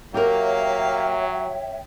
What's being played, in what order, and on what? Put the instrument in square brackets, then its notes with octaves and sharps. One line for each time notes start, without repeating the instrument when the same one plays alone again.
[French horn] F#3 [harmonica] A#3 F5 [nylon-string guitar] G4 A#4 [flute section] C#5 E5 G5